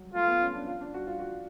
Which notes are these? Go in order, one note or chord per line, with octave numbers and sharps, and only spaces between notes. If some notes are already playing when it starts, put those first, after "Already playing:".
Already playing: F#3
A3 F4
B3
C#4
D4
F4
D4
F#4
F4
F#4